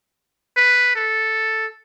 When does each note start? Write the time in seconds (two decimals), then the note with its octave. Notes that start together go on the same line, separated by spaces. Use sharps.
0.57 B4
0.96 A4